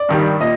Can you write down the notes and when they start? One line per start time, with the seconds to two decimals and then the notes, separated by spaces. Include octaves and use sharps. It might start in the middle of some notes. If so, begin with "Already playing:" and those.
Already playing: D5
0.09 G2 D#3 G3
0.40 A#2 D#5